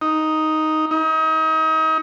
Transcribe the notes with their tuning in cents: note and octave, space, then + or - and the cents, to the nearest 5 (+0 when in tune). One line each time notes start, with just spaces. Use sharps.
D#4 +5
D#4 +35